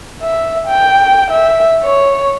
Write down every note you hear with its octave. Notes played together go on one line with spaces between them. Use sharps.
E5
G5
E5
C#5